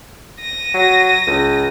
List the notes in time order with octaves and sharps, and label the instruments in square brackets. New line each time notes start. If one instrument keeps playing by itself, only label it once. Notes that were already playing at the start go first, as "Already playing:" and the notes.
[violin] A#6 D#7
[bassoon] F#3
C#2